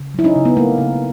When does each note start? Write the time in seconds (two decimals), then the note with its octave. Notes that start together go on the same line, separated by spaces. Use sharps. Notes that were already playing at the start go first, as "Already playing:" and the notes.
Already playing: C#3
0.14 F#3 E4
0.24 C#4 D#4
0.35 C#3
0.45 B3
0.56 A3 A#3
0.78 C#3